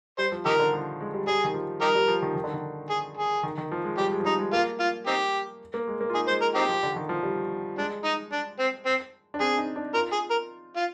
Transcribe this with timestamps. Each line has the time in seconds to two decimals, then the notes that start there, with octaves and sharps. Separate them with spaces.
0.18 G3 C5
0.32 F3
0.45 D#3 D#4 G4 A#4
0.59 D3
0.73 F3
1.00 G#3
1.14 G3
1.27 G3 G#4
1.44 D#3
1.54 F3
1.81 G3 D#4 G4 A#4
1.95 G3
2.08 F3
2.22 D#3
2.35 D#3
2.44 D3
2.54 D#3
2.90 G#4
3.17 G#4
3.43 D#3
3.58 D#3
3.72 F3
3.84 G#3
3.97 G3 G4
4.12 G#3
4.20 F3
4.25 G3 D#4
4.39 G#3
4.53 A#3 F4
4.80 F4
5.07 C4 D#4 G4
5.74 A#3
5.88 G#3
6.01 A#3
6.10 F4
6.15 D#4 G#4
6.28 G#3 C5
6.42 A#4
6.55 C4 D#4 G4
6.69 F3
6.83 D3
6.96 D#3
7.09 F3
7.23 G3
7.78 G#3 D4
8.04 D#4
8.32 D4
8.59 C4
8.86 C4
9.34 D4
9.40 C4 G#4
9.58 D#4
9.76 D4
9.94 F4 A#4
10.12 G#4
10.30 A#4
10.76 F4